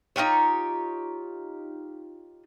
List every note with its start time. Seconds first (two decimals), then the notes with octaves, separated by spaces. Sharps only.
0.16 D#4 F4 G4 C#5